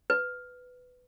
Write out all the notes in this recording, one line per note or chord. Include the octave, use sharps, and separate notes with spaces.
B4